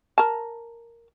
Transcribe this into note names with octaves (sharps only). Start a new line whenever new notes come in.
A#4 A5